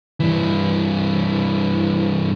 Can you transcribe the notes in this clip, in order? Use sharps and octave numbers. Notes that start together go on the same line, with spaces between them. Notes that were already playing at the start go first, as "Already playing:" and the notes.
G2 E3